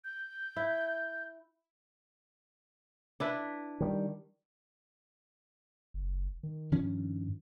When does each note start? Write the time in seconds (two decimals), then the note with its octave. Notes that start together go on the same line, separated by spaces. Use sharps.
0.04 G6
0.56 E4
3.20 D4 E4 B4
3.80 D#3 G3
5.94 F#1
6.43 D#3
6.72 G2 D#3 F3 C#4